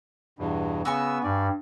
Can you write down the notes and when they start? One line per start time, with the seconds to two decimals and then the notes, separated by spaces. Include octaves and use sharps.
0.39 E2 G2 B2
0.85 C#3 B3 F#4 G#5 C#6 E6
1.24 G2 D5